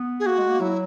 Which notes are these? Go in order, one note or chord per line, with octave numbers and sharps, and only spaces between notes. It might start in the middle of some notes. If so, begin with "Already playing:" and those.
Already playing: B3
G#4
A#3 F#4
G#3
A#3
F#3 E4